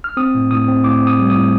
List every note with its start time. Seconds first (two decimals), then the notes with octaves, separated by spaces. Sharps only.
0.04 F6
0.17 C4 D#6
0.35 A2
0.51 A2 D#6
0.68 C4
0.84 A2 D6
1.02 C4
1.07 D#6
1.19 G3
1.30 D#6
1.36 A2